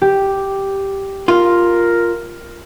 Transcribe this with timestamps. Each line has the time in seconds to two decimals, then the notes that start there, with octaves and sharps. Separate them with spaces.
0.02 G4
1.28 F4 A#4